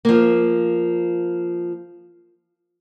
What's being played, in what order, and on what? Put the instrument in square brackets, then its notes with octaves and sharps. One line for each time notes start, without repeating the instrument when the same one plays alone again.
[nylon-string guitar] F3 A#3